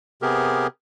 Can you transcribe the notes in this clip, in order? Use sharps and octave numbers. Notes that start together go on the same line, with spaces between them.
C3 B3 G4 G#4 A#4